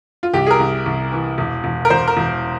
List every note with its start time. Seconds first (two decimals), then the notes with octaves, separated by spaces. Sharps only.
0.23 F4
0.33 C2 G4
0.46 G#4
0.51 A#4
0.59 C2
0.86 C2
1.12 E3
1.38 E1
1.64 E1
1.85 A#4
1.90 E1 C5
2.08 A#4
2.17 E1